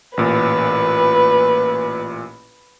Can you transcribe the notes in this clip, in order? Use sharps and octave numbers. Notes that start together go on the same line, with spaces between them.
A1 A#2 B4